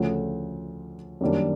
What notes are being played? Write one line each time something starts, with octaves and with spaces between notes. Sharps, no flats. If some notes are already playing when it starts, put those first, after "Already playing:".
Already playing: D2 C#3 F3 A3 C#4
F#2 D#3 G3 A#3 D4